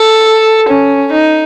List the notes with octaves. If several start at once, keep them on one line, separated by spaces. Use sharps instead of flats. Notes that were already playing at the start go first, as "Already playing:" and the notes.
Already playing: A4
C#4
D#4